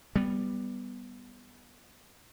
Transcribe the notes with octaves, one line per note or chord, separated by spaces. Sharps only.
G3 B3